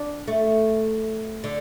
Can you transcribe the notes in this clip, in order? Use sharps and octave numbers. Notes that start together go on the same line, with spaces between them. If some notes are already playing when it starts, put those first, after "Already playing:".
Already playing: D4
A3
D3